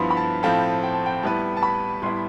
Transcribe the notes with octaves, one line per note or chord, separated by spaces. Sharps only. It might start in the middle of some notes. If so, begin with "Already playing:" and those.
Already playing: G2 F3 B3 E4 B5 C6
B5
A5
A2 F3 C4 F4 A4 G5
G5
A5
G5
A2 G3 B3 E4 B4 A5
A5
B5
A2 G3 B3 E4 C6